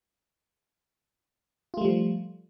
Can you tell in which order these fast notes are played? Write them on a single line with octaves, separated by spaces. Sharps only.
F4 A3 G3 F3